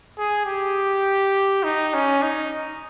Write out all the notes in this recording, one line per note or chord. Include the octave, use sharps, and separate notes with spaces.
G#4
G4
D#4
C#4
D#4